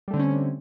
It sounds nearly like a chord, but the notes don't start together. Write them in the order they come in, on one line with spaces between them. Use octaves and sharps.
G3 A3 D3 C4 C#4